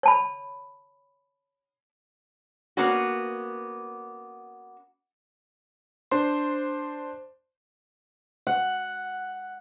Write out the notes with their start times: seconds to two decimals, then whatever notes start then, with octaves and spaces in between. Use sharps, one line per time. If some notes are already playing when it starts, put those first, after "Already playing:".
0.03 C#5 A5 B5
2.77 A#3 B3 C#4 F#4
6.11 D4 C5 C6
8.47 F#5